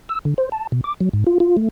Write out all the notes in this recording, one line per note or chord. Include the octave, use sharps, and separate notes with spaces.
E6
D3
C5
A5
B2
D6
F#3
G#2
F4
F4
A3